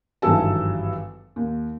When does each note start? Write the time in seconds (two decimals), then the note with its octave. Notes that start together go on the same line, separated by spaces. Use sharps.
0.22 G#1 G2 E3 F#3 A4 A5
1.36 D#2